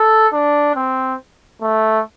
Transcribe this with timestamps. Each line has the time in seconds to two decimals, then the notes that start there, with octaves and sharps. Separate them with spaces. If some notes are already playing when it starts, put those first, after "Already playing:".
Already playing: A4
0.32 D4
0.75 C4
1.62 A3